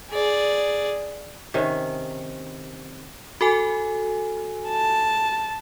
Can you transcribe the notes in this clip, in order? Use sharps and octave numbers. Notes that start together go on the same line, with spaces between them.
G#4 D5
C3 D#3 C#4
F#4 A4 G#5
A5